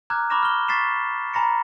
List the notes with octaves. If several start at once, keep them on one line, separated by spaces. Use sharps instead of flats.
A#5 D6 F6 F#6 G#6
B5 C#6 D6 F6 A#6 E7
F6 G7
C#6 A6 B6 C7 E7
G#5 A#5 B5 A#6 C#7